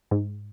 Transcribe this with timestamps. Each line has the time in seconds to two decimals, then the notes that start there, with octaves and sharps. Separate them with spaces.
0.11 G#2